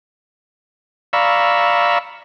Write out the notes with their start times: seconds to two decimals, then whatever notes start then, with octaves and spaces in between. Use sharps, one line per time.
1.13 D5 F5 A#5 B5 C#6 E6